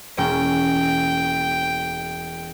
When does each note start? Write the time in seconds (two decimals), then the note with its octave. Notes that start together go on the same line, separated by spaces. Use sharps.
0.18 E1 A#3 C#4 G5